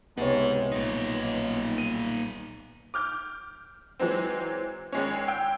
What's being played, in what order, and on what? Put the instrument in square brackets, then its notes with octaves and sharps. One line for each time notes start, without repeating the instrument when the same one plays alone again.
[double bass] C#2 C3 [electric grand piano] B3 C#5 [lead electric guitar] D#4 G#4
[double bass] B1 [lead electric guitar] A#2 D#4
[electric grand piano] D#7
[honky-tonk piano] D6 F6 G6
E3 F#3 G#3 C4
G#1 G#3 C#4
G5 E6